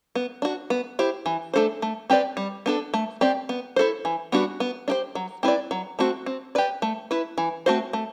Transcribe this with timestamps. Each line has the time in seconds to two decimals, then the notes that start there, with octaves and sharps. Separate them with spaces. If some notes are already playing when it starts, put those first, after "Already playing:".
0.15 B3
0.42 D4 F#4
0.70 B3
0.99 E4 G4 C5
1.26 E3
1.54 A3 D4 A4 C5
1.82 A3
2.10 C4 G4 B4 D5
2.37 G3
2.66 B3 D4 A4
2.94 A3
3.21 C4 G4 D5
3.49 B3
3.76 E4 A4 C5
4.05 E3
4.32 G3 B3 D4 F#4
4.60 B3
4.88 D4 G4 C5
5.15 F#3
5.43 C4 E4 B4 D5
5.71 F#3
5.99 A3 C4 F#4
6.26 C4
6.55 G4 B4 D5
6.82 A3
7.11 E4 B4
7.38 E3
7.66 A3 C4 F#4 C5
7.93 A3